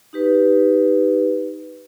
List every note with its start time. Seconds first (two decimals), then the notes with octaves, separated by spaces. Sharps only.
0.13 D#4 G4 B4